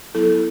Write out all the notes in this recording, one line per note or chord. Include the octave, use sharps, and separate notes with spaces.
F#3 B3 E4 A4